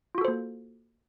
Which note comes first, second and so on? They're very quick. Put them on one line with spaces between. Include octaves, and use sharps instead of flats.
F4 F#4 A4 C5 A#3